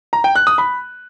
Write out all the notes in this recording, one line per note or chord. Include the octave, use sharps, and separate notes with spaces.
A#5
G5
F#6
D#6
B5